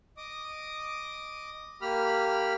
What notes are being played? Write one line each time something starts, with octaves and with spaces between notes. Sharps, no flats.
D#5 D6 D#6
A#3 G4 B5 F6